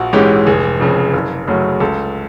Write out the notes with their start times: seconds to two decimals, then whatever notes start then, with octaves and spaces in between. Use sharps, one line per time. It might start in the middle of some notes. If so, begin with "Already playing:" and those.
Already playing: A#1 F#4
0.13 G#2 E3 G#3 C#4 G4
0.46 F1 G#4
0.80 F2 C#3
1.13 F#1
1.48 F#2 C#3 F#3 A3
1.80 C#2 A4